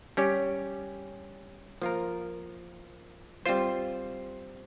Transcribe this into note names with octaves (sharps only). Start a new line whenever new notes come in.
G3 C#4 G4
F3 A#3 F4 A#4
G3 C4 F4 C5